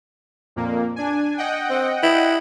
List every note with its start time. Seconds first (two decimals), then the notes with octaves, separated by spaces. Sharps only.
0.56 F2 A#2 A#3
0.96 D4 G#5
1.38 D#5 F#5 G5
1.70 C4
2.03 E4